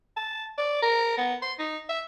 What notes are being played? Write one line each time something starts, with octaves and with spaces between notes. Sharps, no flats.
A5
D5
A#4
B3
C6
D#4
E5